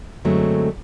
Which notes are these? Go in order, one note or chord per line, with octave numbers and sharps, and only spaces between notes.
F#2 D3 F#3 G#3 A3 C4